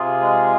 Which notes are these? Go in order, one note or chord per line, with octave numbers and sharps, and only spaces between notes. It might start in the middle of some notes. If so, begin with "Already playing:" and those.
Already playing: C3 F4 G#4
G#3